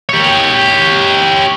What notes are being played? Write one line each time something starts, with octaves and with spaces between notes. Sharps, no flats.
G4 C#5